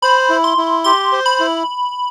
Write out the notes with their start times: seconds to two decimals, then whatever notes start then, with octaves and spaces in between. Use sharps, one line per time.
0.02 C5 B5
0.30 E4
0.44 C6
0.58 E4
0.84 G4 C6
1.12 C5
1.26 B5
1.40 E4